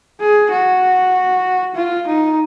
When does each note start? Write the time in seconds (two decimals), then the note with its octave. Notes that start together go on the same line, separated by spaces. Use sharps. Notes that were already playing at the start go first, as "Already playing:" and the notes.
0.20 G#4
0.51 F#4
1.75 F4
2.07 D#4